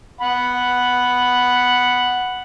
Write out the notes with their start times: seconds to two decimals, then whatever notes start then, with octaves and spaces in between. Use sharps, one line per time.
0.21 F#5 B5